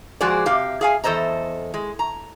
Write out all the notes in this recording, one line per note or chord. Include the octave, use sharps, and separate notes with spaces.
F3 G#3 F#4 G#4 C5 D5
C3 G4 F5
G#4 F5 G#5
E2 A4 C5 D#5 A#5
G#3
A#5